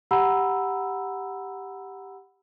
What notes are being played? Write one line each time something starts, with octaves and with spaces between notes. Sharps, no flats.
G4 F#5 A#5 B5 E6